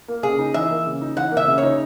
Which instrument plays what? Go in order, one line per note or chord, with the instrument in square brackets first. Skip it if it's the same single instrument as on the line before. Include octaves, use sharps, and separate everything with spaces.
[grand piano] A#3
[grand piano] C#3 [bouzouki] G#4
[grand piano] D#4
[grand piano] E3 [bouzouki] E5
[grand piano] A#3
C#3
D#4
[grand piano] E3 [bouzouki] F#5
[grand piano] A#3
[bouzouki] E5
[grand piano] C#3
[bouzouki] C#5
[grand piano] D#4